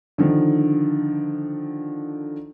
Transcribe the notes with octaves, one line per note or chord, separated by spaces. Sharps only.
D3 D#3 F3